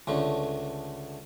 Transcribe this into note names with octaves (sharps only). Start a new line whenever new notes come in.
C#2 D3 A3